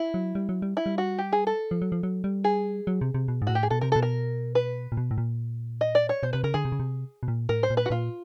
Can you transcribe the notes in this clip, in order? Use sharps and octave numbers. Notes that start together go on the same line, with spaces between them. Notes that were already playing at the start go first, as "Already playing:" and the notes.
Already playing: E4
F#3
G3
F#3
G3
E4
G3
F#4
G4
G#4
A4
F3
F#3
F3
F#3
G3
G#4
F#3
C3
C3
B2
G#2
A2 F#4
G4
G#4
B2 A4
C3 A#4
B2 A4
A#4
B4
A#2
B2
A2
A#2
D#5
D5
C#5
B2 C5
C3 B4
C#3 A#4
D3 G#4
C3
C#3
C3
B2
A#2
A2 A#4
C5
A#2
B4
F#4
A#2 F4